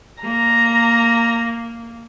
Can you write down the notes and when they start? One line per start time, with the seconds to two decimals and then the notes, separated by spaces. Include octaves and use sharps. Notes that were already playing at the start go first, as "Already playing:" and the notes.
0.23 A#3 A#5